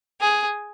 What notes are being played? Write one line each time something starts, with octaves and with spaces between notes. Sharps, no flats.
G#4